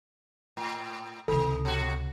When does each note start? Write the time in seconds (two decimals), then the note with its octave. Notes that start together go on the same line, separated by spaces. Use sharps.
0.57 A2
1.28 C#2 C3 D#3 A4
1.65 B2 F#4